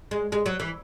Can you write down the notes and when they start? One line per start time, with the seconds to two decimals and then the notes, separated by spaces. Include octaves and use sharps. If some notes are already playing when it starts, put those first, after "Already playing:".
0.11 G#3
0.32 G#3
0.46 F#3
0.60 E3